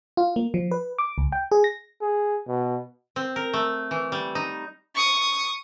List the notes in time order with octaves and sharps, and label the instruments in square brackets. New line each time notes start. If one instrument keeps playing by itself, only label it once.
[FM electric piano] F4
A#3
F3
B4
D6
C#2
G5
G#4
A#6
[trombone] G#4
B2
[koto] C4
A#4
A3
E3
G3
D#4
[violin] C#6 D#6